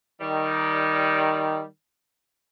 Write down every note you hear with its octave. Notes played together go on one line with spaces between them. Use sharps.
D#3 G3